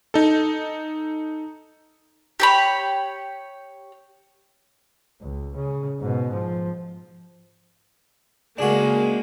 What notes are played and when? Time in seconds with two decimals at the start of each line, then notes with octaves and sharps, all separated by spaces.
0.14 D#4 A4
2.40 G4 C#5 B5
5.22 C#2
5.56 C#3
5.99 G#2 B2
6.33 F3
8.58 C#3 G#3 A#3 D4 F#4 G#4